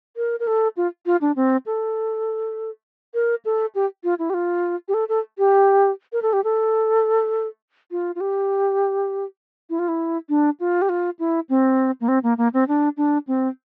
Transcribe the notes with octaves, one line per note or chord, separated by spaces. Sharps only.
A#4
A#4
A4
F4
F4
D4
C4
A4
A#4
A4
G4
F4
E4
G4
F4
G4
A4
A4
G4
A#4
A4
G4
A4
F4
F4
G4
E4
F4
E4
D4
F4
G4
F4
E4
C4
A#3
C4
A#3
A#3
C4
D4
D4
C4